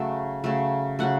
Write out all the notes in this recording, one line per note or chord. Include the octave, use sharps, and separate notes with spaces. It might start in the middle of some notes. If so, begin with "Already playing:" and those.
Already playing: C#3 F#3 A3 A5
C#3 F#3 A3
C#3 F#3 A3 F#5